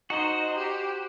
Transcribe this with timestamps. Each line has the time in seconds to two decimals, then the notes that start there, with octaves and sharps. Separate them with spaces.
0.10 D#4 F#4 C5
0.58 G4